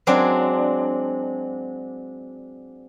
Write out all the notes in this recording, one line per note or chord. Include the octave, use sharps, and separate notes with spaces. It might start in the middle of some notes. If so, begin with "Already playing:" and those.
F#3 G#3 C4 D4